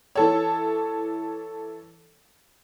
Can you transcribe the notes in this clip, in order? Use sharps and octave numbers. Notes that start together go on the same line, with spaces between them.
E3 A4 C#5